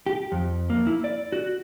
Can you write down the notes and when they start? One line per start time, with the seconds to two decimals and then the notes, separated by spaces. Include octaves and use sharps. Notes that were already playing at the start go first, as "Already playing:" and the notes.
0.06 G4
0.32 F2
0.70 A#3
0.87 E4
1.04 D5
1.32 F#4